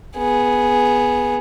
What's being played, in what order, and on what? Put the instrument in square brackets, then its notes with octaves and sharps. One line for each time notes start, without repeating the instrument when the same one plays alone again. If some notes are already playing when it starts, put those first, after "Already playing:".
[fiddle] B3 G#4